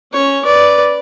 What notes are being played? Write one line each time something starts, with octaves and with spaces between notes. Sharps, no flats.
C#4 C#5
B4 D5